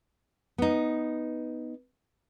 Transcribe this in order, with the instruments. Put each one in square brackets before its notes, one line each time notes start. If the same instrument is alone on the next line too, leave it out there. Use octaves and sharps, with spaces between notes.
[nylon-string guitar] B3 D#4